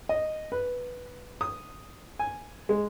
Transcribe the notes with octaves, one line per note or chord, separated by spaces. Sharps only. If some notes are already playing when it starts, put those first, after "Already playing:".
D#5
B4
D#6
G#5
G#3